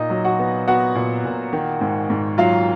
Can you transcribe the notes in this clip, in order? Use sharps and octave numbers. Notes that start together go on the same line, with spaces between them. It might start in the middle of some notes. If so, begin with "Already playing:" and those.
Already playing: A#2 D#4 D#5
F#3
F#4 F#5
B3
B3 F#4 F#5
A#2
A#2
D#3
G#2
G#2
F#3 F4 F5